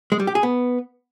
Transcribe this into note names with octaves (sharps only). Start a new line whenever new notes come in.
G#3
G3
G4
G#4
B3